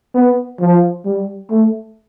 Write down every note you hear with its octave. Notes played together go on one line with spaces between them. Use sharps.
B3
F3
G3
A3